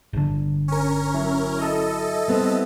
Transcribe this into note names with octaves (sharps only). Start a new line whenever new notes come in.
G1 D3
C#4 A#4 C#5
F#3 E4
A4 D#5
G3 B3 C4